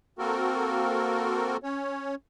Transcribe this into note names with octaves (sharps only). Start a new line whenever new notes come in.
A#3 C4 F#4 A4 A#4
C#4 C#5